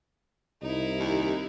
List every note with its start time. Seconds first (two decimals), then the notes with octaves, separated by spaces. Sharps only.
0.62 C2 D#4 E4
0.99 D#2